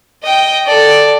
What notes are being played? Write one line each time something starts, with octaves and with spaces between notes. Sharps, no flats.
D#5 G5
A4 D5